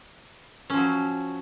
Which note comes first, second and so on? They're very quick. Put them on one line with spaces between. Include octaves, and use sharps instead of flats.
C#4 F3 F#3